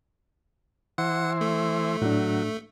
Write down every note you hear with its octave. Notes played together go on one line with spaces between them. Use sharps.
E3 C5 F#5
A3
A2 F#3 D4